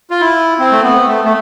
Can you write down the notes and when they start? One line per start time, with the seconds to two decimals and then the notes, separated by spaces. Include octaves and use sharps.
0.11 F4
0.20 E4
0.59 C4
0.72 A3
0.83 B3
1.08 A3
1.25 A3